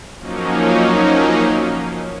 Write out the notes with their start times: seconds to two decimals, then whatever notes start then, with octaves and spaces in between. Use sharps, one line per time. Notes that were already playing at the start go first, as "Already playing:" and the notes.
0.18 F3 F#3 A#3 C#4 D#4